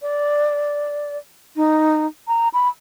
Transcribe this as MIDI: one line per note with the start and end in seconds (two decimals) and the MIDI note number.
0.02 1.18 74
1.56 2.06 63
2.28 2.49 82
2.54 2.69 83